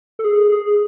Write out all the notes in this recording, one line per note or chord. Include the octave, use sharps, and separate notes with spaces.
A4
G#4
G#4